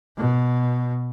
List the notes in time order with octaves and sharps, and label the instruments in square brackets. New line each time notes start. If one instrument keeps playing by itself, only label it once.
[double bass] B2